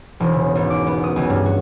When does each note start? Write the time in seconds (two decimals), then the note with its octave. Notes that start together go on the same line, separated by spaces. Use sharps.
0.20 E1
0.33 C#3
0.55 G#1
0.70 D6
0.87 B3
1.04 D#6
1.16 C#2
1.30 G2
1.46 F#4